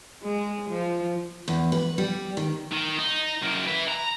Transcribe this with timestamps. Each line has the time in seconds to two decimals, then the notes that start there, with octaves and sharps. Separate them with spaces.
0.23 G#3
0.70 F3
1.48 E2
1.72 B4
1.98 G3
2.37 D#3
2.72 D#3
2.99 D#4
3.43 F#2 A#3
3.68 B4 E5
3.89 A#5